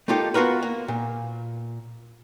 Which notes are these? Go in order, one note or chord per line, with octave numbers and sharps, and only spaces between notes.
A3 A#3 D#4 F4 G4 A4
B3 F4 F#4 A#4 B4
A#3
A#2